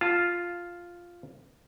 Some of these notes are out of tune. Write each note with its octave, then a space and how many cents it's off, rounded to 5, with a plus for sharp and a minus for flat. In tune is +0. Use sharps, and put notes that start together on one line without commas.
F4 +0 A5 +0